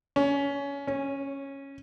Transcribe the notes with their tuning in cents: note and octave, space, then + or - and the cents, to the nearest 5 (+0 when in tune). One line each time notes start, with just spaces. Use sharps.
C#4 +20
C#4 -10